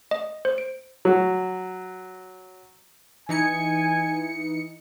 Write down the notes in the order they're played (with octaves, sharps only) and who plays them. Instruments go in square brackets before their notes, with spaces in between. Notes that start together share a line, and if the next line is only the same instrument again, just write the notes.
[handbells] D#5
C5
D7
[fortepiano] F#3 F#4
[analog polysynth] E3 D#4 C#7 [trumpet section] G#5